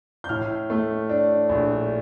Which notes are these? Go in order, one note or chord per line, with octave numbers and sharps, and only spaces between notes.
G6
A2 F6
A3
D4
A#1